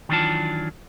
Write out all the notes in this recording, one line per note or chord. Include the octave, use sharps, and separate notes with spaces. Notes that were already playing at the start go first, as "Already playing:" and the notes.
D#3 E3 F#3 D4 F4 A5